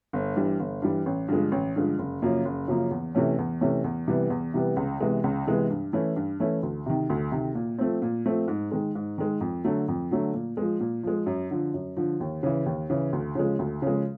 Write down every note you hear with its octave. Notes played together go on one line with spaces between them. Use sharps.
G1
G2 E3 G3
G1
G2 E3 G3
A1
G2 D3 F3 G#3
A1
G2 D3 F3 G#3
F#1
F#2 C#3 F3 A#3
F#1
F#2 C#3 F3 A#3
E2
C3 E3 A3 C#4
E2
C3 E3 A3 C#4
E2
C3 E3 G3 B3
E2
C3 E3 G3 B3
C#2
C3 E3 G#3 B3
C#2
C3 E3 G#3 B3
G2
E3 A3 C#4 E4
G2
E3 A3 C#4 E4
D2
C3 D#3
D2
C3 D#3
A#2
F3 A3 C4
A#2
F3 A3 C4
G#2
D#3 G#3
G#2
D#3 G#3
F2
D3 F#3 A3
F2
D3 F#3 A3
A#2
F3 G#3
A#2
F3 G#3
F#2
D3 F3
F#2
D3 F3
D#2
C#3 E3
D#2
C#3 E3
D2
C#3 F3 G#3
D2
C#3 F3 G#3